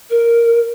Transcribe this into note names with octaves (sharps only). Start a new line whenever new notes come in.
A#4